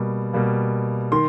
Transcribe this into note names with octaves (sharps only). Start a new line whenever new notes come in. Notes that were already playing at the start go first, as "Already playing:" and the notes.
Already playing: B2 G3 A#3
B2 G3 A#3
D#3 C6